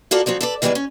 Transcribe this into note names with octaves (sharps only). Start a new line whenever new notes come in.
A#3 F4 F#4 A4 D5
F3 F#3 C4 F#4
A4 B4 D5
D#3 E3 G3 G#3 A#3 B3
C#4